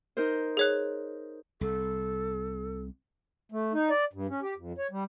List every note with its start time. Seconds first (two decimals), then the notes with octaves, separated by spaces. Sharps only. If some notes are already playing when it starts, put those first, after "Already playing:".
0.17 D#4 A#4 C5
0.57 G#4 C#5 F#6
1.61 C2 A4
3.52 A3
3.73 D#4
3.90 D5
4.13 G2
4.29 C#4
4.42 G4
4.56 F2
4.78 C#5
4.91 G3